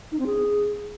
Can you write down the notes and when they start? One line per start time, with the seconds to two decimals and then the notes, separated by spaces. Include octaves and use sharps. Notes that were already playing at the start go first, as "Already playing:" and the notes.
0.12 D#4
0.19 C4
0.26 G#4